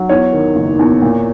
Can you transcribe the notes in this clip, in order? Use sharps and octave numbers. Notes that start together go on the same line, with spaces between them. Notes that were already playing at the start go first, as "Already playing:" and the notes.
Already playing: F#3
E2 C#5
D#3
F#1
E2
A#2